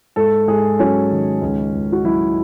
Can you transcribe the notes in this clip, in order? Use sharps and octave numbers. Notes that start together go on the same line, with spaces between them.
G#2 A4
G#2 G#4
F#3 C#4
D#3
C#2
C#2
F#4
F#3 E4